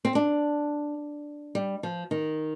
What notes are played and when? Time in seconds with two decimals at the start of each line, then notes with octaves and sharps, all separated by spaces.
0.05 C4
0.15 D4
1.55 G3
1.83 F3
2.11 D#3